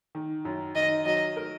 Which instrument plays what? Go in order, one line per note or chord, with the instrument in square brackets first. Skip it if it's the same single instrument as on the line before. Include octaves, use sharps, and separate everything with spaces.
[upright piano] D#3
F#2
[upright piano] D#3 [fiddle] D#5
[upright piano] F#3 [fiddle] D#5
[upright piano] A#4